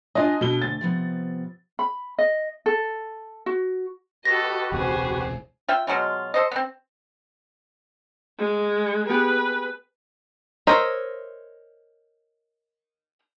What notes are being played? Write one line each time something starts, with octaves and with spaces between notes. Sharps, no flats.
D4 F4 D#5 G#5
B2 A4 G7
D2 A6
C3 F3 B3
B5
D#5
A4
F#4
F#4 G4 A4 B4 D#5 A#6
E1 C#2 C3 G#4 C5
F4 E5 G5
B2 F#3 G#3 F4
A4 C5 D#5
B3 C4
G#3
B3 G4 G#4 B4
A#4 C5 C#5 D#5 E5